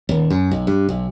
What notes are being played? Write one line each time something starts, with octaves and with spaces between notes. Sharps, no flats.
D#1
F#2
B1
G2
B1